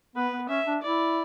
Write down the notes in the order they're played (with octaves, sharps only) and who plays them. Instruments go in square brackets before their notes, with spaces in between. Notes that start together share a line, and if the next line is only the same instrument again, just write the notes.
[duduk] B3 [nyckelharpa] B4
[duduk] B3
[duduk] C#4 [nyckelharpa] E5
[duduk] D4
[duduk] E4 [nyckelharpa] D5